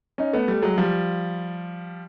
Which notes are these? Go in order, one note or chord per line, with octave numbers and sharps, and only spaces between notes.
C#4 D#4
A3 B3
G3 A3
F#3 G#3
F3 G3